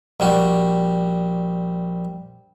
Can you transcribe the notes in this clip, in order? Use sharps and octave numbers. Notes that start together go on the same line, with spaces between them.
A#1 G3 F#4